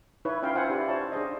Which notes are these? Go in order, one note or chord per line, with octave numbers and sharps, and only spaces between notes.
D#4 E4 B4 C#5
C#4 D#4 F4 E5 F5 G5
F4 B4 C5 F#5 G#5
E4 F4 G4 B4 D5 G#5
C5 C#5 A5
D4 G#4 C5 D#5